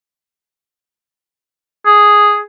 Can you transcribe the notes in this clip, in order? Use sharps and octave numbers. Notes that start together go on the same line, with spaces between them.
G#4